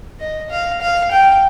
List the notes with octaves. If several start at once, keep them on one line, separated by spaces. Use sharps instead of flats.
D#5
F5
F5
G5